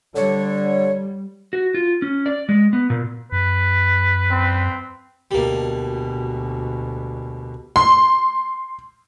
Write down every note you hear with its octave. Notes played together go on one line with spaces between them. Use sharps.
D3 G3 C#5
F#4
F4
C#4
D5
G#3
B3
A#2
F#2 B4
C4
D2 B2 G3 A#3
C6